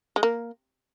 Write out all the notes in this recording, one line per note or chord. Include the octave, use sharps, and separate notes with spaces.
G#3
A#3